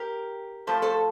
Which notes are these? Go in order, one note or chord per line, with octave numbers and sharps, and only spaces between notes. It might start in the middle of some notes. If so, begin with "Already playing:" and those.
Already playing: G4 A#4
A2 F3 A3 A4 C5
A4 C5